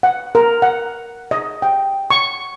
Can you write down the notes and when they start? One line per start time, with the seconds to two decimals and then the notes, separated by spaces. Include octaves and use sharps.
0.03 F#5
0.35 A#4
0.62 F#5
1.31 D#5
1.62 G5
2.10 C#6